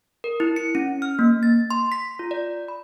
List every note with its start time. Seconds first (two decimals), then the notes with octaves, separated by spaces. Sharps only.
0.24 A#4
0.40 E4
0.56 C#7
0.75 C#4
1.02 F6
1.19 A#3
1.43 A6
1.70 C6
1.92 B6
2.19 F4
2.31 D5
2.68 B5